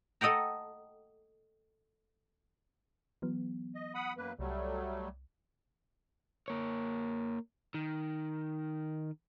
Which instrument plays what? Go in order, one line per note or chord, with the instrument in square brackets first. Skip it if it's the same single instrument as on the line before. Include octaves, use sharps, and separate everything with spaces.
[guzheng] A4 D#5 F#5 G5 A#5
[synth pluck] E3 F#3 B3
[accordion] D#5
F#5 B5 D#6
F#2 A#3 B4
[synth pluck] C2 [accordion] F#3 G3 A3
[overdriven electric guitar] A#3 C#5
D#3